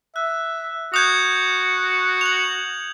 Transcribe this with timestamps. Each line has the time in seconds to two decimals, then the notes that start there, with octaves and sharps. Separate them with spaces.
0.16 E5 F#6
0.94 F#4 D#6 G6 G#6
2.21 F7 F#7